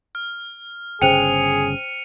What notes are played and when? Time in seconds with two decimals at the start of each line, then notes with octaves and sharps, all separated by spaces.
0.15 F6
1.02 G1 C#3 G#4 C5 G5 C#7 D#7 F7